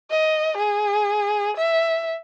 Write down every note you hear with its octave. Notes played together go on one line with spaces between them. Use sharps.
D#5
G#4
E5